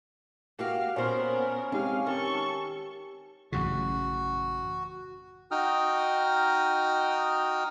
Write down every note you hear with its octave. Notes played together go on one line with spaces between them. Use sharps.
A#3 F#4 G4 F5
A#2 B3 C#4 A#4 C5
G#3 C4 D#4 G4 F5
D#3 G4 A4 C#6
A1 F#2 C#3 F#4
D#4 F#4 G5 D#6 F6